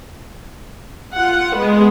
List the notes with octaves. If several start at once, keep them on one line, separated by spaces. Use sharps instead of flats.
F4 F#5
G#3 B3